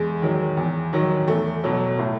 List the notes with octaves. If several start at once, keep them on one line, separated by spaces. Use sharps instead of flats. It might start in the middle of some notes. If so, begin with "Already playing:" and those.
Already playing: E2 G#3
D#3 F#3
E2
D#3 F#3
E2 A3
B2 F#3
A2